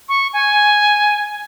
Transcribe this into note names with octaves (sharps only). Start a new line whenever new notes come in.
C#6
G#5